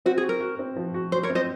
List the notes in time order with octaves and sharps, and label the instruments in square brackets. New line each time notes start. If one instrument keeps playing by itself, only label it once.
[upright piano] C4 [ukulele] F#4
[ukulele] G#4
[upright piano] F#4
[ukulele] A#4
[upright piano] F#4
C4
F3
F#4
[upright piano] F#4 [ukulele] C5
[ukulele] A#4 C#5
[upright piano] C4
[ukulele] C5 D#5